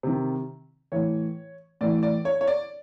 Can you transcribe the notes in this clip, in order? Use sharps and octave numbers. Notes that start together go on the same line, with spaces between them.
C3 D#3
A2 E3 C#5
A2 E3 D5
D5
C#5
C#5
D5